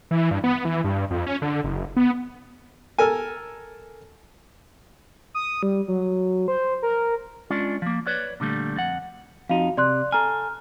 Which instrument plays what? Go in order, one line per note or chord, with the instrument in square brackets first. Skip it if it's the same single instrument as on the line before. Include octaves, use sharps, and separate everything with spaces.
[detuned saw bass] E3
G2
B3
E3
G2
F2
C#4
D3
F#1
B3
[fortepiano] A4 A#4 G#5
[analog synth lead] D#6
G3
F#3
C5
A#4
[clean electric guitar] G#3 C#4 D4 F4 D5
F3 A#3
B4 C#5 D5
A#2 D3 G3 A3
F2 F#5
[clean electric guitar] F2 D#4 [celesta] F#4 F5
[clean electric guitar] C3 [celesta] D5 C6 F#6
[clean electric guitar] A4 G#5 [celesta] A#5 F6